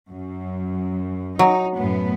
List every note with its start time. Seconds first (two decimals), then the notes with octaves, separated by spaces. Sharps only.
0.10 F#2
1.39 F#3 D#4
1.77 F#2 A2 B3